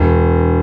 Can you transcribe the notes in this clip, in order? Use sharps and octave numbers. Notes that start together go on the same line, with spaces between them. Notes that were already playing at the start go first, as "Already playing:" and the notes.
Already playing: E1